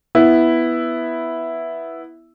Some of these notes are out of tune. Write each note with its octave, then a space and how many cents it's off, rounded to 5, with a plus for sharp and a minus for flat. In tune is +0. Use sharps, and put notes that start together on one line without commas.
B3 +0 E4 +0